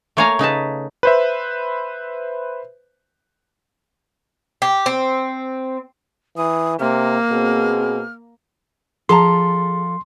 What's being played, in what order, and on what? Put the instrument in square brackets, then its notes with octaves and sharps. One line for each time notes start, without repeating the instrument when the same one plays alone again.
[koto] A3 A#3 C#5 F5 G#5 A#5
C#3 D#4 B4 A5
[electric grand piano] B4 C5 E5
[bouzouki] G4
C4
[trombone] E3 [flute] D#6
[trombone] C3 [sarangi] A#3 [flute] F6
[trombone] B2 [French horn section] C4 G#4
[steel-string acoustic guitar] F3 A4 [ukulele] G#4 A5 A#5 [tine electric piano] C6